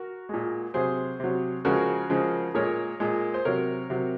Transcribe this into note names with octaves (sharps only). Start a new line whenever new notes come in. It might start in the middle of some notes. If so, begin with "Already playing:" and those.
Already playing: F#4 A#4
A#2 G#3
C3 F#3 G#4 C5
C3 F#3
C#3 F3 G#3 F#4 A#4
C#3 F3 G#3
A#2 G#3 A#4 C#5
A#2 G#3
C5
C3 F#3 A#4 C#5
C3 F#3